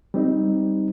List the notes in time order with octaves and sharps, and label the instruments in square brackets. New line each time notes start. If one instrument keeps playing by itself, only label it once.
[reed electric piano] G3 C4 D#4